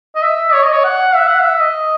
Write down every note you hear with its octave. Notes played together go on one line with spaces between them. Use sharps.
D#5
E5
C#5
D#5
C#5
F#5
E5
F#5
E5
D#5